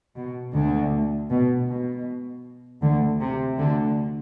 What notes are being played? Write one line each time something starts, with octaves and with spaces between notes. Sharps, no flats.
B2
D2 D3
B2
B2
D2 D3
C3
D2 D3